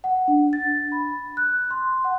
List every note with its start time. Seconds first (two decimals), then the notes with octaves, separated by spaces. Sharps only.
0.04 F#5
0.28 D4
0.53 A6
0.92 B5
1.37 F#6
1.71 C6
2.04 F#5